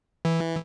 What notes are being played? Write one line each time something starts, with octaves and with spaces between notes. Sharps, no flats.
E3